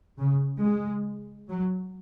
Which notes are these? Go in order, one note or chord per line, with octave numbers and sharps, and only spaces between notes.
C#3
G#3
F#3